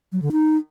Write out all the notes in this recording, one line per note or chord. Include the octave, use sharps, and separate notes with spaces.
F#3
D3
D#4